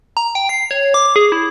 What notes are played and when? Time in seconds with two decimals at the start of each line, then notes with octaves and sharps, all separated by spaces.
0.17 A#5
0.35 G5
0.49 C7
0.71 C#5
0.94 D6
1.16 G#4
1.32 E4